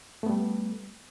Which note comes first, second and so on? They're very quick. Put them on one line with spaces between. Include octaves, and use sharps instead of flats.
A3 B3 G3